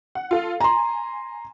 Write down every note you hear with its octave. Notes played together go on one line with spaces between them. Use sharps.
F#5
F4 A4 F5
G#5 A#5 C6